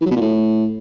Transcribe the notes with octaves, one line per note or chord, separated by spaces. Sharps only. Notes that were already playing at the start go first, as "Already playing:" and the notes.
E3
F#3
B2
A#2
A2